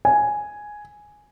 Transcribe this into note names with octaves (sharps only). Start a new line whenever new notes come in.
G#5